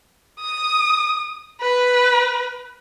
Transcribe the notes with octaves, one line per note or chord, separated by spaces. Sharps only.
D#6
B4